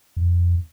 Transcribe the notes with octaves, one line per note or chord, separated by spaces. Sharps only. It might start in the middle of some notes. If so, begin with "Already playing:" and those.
F2